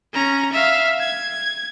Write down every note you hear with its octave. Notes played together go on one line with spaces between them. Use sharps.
C#4 A#5
E5 F5
G#6